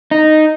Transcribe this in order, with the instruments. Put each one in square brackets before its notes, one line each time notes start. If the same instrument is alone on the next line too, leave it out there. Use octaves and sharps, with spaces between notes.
[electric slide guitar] D#4